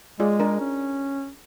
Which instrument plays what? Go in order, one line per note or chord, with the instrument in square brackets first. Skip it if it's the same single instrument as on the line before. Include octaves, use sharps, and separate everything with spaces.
[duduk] G#3 [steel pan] F4 G#4 D5
[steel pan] D4 A#4
[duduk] C#4